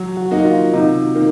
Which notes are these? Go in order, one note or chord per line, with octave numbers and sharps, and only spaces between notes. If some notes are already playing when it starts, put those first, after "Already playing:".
Already playing: F#3
F#4
A#3 D#4 F#4
F4
C3 D#4
D#3 A#3